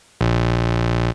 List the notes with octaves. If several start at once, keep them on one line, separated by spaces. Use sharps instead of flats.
A#1